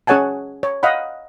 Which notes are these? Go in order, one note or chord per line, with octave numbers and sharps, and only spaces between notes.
C#4 G#4 C#5 F#5 G#5 A5
C#5
D#5 F5 F#5 B5